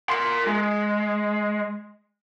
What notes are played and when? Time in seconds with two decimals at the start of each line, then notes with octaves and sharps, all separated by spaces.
0.09 A#4 C6
0.47 G#3